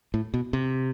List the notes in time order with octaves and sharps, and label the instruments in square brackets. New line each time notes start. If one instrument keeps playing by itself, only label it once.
[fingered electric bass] A2
B2
C3